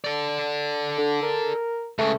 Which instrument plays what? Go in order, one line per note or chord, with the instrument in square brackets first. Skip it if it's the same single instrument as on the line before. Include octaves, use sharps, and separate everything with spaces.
[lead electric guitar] A4 D5
[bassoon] D3
A#4
[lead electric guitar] C#2 C#3 [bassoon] A3